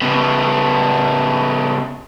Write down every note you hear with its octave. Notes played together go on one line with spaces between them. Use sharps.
C#3 B3